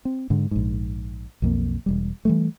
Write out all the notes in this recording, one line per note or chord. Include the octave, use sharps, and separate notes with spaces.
C4
G#2 D3 G#3
A#1 G#2
B1 F2 A#3
E1 G3
E3 G3 A3